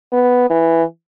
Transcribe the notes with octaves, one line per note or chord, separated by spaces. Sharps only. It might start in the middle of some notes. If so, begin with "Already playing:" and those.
B3
E3